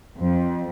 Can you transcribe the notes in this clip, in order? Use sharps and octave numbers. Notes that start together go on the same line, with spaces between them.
F2